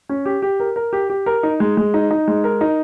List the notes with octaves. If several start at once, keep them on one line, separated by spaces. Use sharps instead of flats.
C#4
G4
G4
A#4
A#4
G4
G4
A#4
D#4
G#3
G#3
D#4
D#4
G#3
A#4
D#4